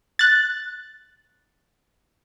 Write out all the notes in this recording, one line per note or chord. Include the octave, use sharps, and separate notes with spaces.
F#6 A6